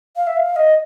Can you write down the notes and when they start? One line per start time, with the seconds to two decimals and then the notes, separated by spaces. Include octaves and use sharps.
0.17 F5
0.27 E5
0.37 F5
0.56 D#5